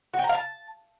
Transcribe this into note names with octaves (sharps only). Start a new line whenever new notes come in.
F#4
G5
A#5
F5
A5